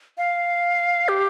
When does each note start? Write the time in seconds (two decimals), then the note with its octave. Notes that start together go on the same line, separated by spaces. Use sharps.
0.18 F5
1.08 G4